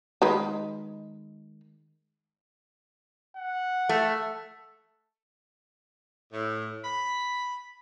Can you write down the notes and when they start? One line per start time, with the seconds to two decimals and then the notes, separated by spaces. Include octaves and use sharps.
0.22 D#3 G#3 B4
3.36 F#5
3.89 A3
6.33 A2
6.85 B5